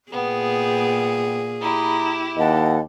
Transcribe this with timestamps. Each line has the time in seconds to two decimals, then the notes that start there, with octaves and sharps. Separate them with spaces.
0.12 A#2 B3 G#4 G5
1.62 E4 G4 A#5 B5 D#6
2.37 D#2 D#5 F#5 A5